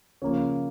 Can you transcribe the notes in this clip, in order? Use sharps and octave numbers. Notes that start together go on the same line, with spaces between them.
C#3 F3 A#3 C#5